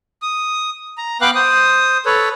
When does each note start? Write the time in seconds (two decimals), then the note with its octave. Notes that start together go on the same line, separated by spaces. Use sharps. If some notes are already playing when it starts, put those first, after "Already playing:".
0.22 D#6
0.98 A#5
1.21 B3 B4 F5 G5 D6 F#6
1.35 C5 D#6
2.06 A4 B4 C#5